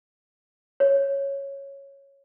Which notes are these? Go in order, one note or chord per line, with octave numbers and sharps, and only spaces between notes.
C#5